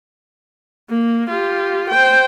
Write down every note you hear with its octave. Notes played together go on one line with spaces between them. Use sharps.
A#3
F4 G4
C5 G5